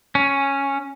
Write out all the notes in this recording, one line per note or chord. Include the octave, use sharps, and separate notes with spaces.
C#4